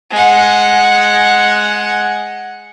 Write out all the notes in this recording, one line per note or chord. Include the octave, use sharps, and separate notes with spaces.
G#3 F#5